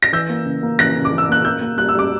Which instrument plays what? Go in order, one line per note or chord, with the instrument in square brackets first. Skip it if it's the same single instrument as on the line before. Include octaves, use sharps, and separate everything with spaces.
[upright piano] A#6
E3 E6 G6
A#3
C#3
A#3
E3 F#6 A#6
C#3
D6
E3
E6
A#3 F#6
A#3 E6 G6
A#3
G3 F#6
E6
G3 D6